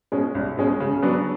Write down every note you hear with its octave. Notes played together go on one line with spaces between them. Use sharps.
B2 G#3 C#4
C2
B2 G#3 C#4
C#3
F#3 B3 D4